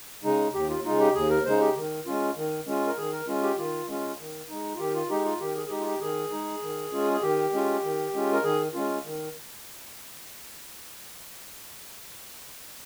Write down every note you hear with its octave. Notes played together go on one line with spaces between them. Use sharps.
C#3 G#3 D#4
D#2 G4
F4
C#3 G#3 D#4 F4
G4
D#2 G#4
A#4
C#3 G#3 D#4 C5
G4
D#3
G#3 C#4 F4
D#3
G#3 C#4 F4
A#4
D#3 G#4
A#4
G#3 C#4 F4
G4
D#3 F4
G#3 C#4 F4
D#3
G#3 D#4
F4
D#3 G4
F4
G#3 D#4 G4
F4
D#3 G4
G#4
G#4
G#3 D#4 G4
F4
G4
D#3 G#4
G#3 D#4
D#3
G#3 C#4 F4
G#4
D#3 G4
G#3 C#4 F4
D#3
G#3 C#4 F4
A#4
D#3 G#4
G#3 C#4 F4
D#3